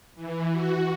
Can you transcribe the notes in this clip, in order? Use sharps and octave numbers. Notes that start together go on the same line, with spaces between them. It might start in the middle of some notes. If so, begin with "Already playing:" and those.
E3
F#4